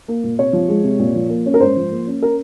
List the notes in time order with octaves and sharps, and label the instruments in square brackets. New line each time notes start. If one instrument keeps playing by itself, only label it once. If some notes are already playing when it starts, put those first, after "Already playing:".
[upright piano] A#3
A#2
C3 C#5
F3
G#3
C3
A#2
F3
A#3
C#4
A#4
G#2 C5
F3
A#3
C#4
A#4